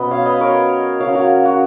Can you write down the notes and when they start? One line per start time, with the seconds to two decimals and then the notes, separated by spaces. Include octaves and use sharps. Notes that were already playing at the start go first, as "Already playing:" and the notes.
Already playing: B2 F#3 C#4 B4 D#5
0.11 C#5 F5
0.26 B4 D#5
0.41 A#4 C#5
1.00 C#3 F#3 C#4 C#5 F5
1.15 F#4 A#4
1.45 F#4